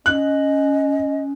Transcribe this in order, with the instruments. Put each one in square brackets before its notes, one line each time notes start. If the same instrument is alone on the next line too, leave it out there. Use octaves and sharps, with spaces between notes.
[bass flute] C#4 [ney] D#5 [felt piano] F#6